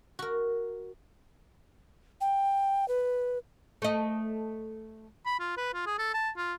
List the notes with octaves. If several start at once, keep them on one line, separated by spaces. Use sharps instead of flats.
F#4 A#4
G5
B4
A3 D#5
B5
F4
B4
F4
G#4
A4
A5
F4